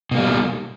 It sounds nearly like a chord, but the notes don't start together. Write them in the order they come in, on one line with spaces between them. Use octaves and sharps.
B2 A#3 G3